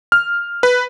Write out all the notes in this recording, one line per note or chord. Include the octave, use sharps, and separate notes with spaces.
F6
B4